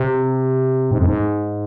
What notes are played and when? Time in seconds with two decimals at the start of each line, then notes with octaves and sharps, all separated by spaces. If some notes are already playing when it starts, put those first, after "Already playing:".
Already playing: C3
0.91 G#2
0.99 F2
1.06 G#2